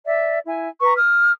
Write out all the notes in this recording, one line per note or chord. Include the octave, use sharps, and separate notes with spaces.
D5 E5
E4 G#5
B4 A#5 C#6
D#6 F6